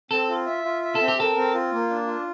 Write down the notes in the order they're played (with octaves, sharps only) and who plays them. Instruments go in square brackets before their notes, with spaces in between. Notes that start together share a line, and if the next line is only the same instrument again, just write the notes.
[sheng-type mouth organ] C4 [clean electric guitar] A4
[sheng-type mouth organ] F4
E5
F4
E5
[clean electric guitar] A4
[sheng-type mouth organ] C4
[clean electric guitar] G4
[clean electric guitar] A4 [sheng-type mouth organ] A#4
[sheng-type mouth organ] C4
F4
A#3
D4
F4